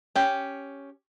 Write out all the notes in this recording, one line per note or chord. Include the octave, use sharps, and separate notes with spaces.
C#4 G4